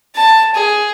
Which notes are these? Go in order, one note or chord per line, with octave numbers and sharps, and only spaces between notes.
A5
G#4